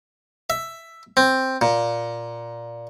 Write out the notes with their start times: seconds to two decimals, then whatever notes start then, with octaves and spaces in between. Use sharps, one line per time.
0.50 E5
1.17 C4
1.61 A#2